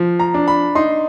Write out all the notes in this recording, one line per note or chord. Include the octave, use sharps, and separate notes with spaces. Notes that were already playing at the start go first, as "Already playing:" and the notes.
Already playing: F3
A#5
D4
B5
D#4 C6